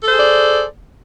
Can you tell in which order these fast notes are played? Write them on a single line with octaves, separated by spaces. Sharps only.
A4 C5 G#4 D5